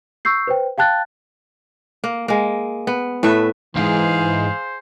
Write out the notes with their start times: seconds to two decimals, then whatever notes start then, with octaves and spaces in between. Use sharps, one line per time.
0.25 C#6 E6 G6 C7
0.47 B4 C5 G5
0.78 F5 G5 A5 F#6 A6
2.04 A#3
2.28 G#3 A#3
2.87 B3
3.23 A2 A3 B4 E5
3.75 B1 G#2 E3 G#4 C5 F5